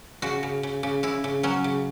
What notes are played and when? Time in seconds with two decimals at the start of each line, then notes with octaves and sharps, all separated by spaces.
0.22 C#3 F#4
0.43 C#3
0.63 C#3
0.83 C#3
1.03 C#3 E4
1.24 C#3
1.43 F#3 C#4
1.64 C#3